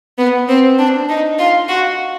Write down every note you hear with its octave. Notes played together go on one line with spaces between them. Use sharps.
B3
C4
D4
D#4
F4
F#4